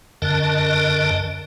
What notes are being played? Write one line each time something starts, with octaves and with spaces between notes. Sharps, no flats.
F#2 D3 A#4 D#5 A5